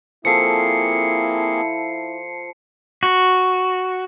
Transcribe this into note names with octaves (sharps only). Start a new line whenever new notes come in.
F3 A#3 C4 E4 G#4 A4 C7 C#7
F#4